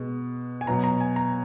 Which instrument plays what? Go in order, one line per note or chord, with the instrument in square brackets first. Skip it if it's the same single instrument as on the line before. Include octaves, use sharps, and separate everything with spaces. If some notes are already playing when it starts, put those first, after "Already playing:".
Already playing: [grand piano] B2 G#3
G#5
B2 F#3 A#5
A#5
G#5
A#5